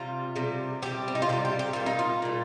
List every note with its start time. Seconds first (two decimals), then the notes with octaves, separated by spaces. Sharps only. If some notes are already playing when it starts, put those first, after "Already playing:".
Already playing: C3 G3 F4
0.36 C3 G3
0.82 C3 G3 G4
1.08 C4
1.15 D#4
1.22 F4
1.29 C3 G3 G4
1.45 G4
1.59 G4
1.73 A#2 G3 F4
1.86 D#4
1.99 F4
2.22 A#2 G3